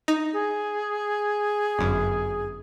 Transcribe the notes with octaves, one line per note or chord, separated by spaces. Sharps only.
D#4
G#4
G1 F#2